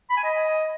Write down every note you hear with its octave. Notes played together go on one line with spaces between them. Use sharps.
B5
G#5
D#5